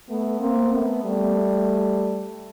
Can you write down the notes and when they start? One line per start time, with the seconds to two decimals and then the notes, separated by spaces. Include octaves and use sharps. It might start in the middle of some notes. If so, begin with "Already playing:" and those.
0.09 A3 B3
0.40 A#3 C4
0.71 A3 B3
1.03 G3 A3